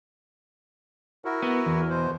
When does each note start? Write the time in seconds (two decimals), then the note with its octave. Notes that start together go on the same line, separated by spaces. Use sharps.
1.25 E4 F#4 A#4
1.42 B3
1.66 E2
1.90 B2 C5